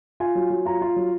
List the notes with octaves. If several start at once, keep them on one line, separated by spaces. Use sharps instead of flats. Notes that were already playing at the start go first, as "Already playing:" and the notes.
F4 G#5
F#3
F#3
F4 A#5
F4
F#3